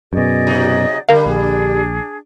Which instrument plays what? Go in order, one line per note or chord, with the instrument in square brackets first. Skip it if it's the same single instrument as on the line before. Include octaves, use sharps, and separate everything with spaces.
[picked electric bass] F#2 B2 [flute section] G#4 D5 D#5
[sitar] C3 F#3 D#4
[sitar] D3 G3 [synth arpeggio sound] A#4 F5 [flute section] G6
[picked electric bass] A#1 [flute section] D4 G#4